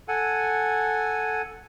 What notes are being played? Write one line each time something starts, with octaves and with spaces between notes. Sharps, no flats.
A4 F#5 G#5